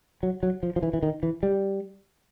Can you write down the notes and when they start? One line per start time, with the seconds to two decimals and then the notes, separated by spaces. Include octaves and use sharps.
0.23 F#3
0.43 F#3
0.63 F3
0.76 F3
0.83 E3
0.93 E3
1.03 D#3
1.23 E3
1.43 G3